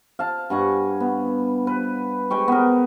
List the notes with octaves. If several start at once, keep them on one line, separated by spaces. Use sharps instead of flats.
F5 A5
G2 F#5 G#5 C#6
B3
B4
G#3 B4 G5 C#6
B3 A#4